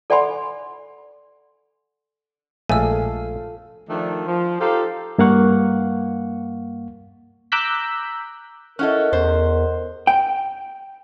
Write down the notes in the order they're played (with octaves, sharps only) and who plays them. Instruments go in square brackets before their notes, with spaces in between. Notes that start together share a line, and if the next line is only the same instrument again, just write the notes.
[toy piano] A4 D5 F#5 G#5 B5 C6
[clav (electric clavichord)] A#1 G#3 A3 [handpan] F4 A4 F5 [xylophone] G#5 E6
[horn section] D#3 F3 A3 D4
F3
D#4 F4 G4 A4 C5 F5
[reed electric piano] G2 A#3 F5 F#5 C#6
[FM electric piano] A#5 D6 E6 F#6 G6 B6
[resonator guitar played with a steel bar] C#4 E4 A4 [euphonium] A#4 [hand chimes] D#5 F#5 F#6
[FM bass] E2 [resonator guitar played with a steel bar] C5
[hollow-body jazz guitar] G5